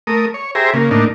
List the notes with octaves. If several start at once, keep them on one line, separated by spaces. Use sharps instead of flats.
A3 A#4 D#6
C#5
G4 G#4 C5 E5 A#5
C#3 A#3
A2 A#3 D4 D#4